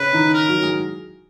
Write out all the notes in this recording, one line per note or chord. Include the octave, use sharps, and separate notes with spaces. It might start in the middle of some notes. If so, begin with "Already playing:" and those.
Already playing: C#3 C#4 B4
D#3 D#4
A#4
F#3 F#4
G#3 G#4